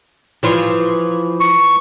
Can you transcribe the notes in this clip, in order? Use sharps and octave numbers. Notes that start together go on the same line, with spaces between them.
E3 F3 F4
C#6